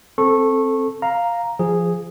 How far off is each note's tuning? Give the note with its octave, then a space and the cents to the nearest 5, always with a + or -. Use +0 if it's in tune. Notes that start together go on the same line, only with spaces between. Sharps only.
C4 +10 A4 +0 C#6 -20
F5 +0 A#5 +0
F3 -15 G#4 -5